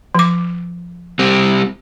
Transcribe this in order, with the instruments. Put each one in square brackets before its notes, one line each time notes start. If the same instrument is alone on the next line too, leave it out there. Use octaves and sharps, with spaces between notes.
[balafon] F3 D6
[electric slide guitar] G3 C4